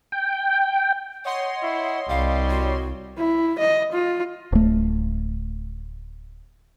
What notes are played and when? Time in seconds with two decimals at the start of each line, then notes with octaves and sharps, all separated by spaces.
0.12 G5
1.25 C#5 D#5 F#5 C6
1.63 E4
2.09 C2 G3 F5
2.50 F#4
3.18 E4
3.59 D#5
3.93 F4
4.52 D1 A3